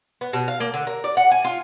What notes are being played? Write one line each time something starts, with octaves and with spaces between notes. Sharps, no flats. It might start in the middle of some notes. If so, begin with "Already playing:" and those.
B3
B2
F5
A#3
D3
A#4
D5
F#5
G#5
F4